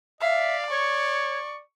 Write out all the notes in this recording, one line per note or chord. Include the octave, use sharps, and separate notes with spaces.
D5 E5 F5
C#5 C#6